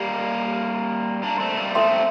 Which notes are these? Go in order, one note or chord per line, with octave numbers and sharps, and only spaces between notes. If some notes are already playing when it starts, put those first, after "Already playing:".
Already playing: G3 A#3 G4
A#3 D4
A3 C4
G3 A#3
A3 C4 A4 E5 G5 C6